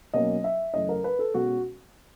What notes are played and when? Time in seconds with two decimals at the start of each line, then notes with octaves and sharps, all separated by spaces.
0.14 B2 F#3 A#3 C#4 D#5
0.44 E5
0.74 F#2 C#3 E3 A3 C#4 D#5
0.89 A#4
1.04 B4
1.19 A4
1.34 B2 G#3 C#4 F#4